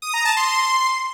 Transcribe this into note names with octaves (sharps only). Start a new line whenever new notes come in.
D#6
A#5
A5
C6